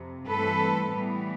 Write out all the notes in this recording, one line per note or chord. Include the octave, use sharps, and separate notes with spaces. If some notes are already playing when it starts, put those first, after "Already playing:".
Already playing: F2 C3
G2 E3 A3 C4 A4 B4
A2 E3 G3 B3